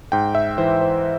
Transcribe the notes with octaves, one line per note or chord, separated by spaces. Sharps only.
G#2 G5
E5
E3 C5
C5